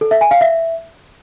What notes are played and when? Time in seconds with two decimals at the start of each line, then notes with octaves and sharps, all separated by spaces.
0.01 A4
0.11 E5
0.21 G#5
0.31 F5
0.41 E5